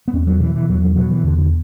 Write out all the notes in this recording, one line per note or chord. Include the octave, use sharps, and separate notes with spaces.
B3
E2 C#4
F#3
B2 E3
E3
E2 F#3
F#3
B2 F#3
E3
E2 D3
D3